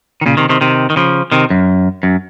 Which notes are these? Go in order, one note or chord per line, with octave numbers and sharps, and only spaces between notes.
D#3
A#2 C#3
C3 D#3
C3 D#3
C3 D#3
D#3
C#3 F3
C3 D#3
F#2
F#2